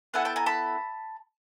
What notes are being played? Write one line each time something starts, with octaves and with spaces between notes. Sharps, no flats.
B3 E4 A4 F#5 G#5
G5 A5
G#5 A#5
A5 B5